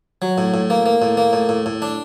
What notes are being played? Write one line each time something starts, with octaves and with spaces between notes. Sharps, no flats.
F#3
A2
A2
A#3
A#3
A2
A#3
A2
A2
A2
D4